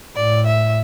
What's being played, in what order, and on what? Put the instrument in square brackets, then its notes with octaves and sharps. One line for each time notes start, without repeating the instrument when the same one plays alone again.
[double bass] A2 [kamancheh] D5
[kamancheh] E5